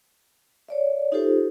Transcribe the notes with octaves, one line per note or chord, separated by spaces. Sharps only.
C#5 D5 E5
D#4 F4 G4 A4 C5